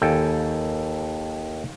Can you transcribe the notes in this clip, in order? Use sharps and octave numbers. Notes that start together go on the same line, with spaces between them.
D#2 A4 G5 G#5